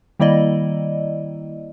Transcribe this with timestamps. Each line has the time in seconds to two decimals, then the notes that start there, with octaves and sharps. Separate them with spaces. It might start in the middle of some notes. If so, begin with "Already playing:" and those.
0.20 D#3 G3 A#3 E4 D5 D#5